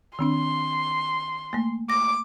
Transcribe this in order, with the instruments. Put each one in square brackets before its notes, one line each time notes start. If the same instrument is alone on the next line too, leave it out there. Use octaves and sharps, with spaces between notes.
[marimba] D#3 C4 D4 [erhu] C6
[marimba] A3 A#3
[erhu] D6 [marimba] A#6